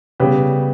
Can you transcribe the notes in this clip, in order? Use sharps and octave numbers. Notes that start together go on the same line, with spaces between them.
C#3 G3 B3 G4 B4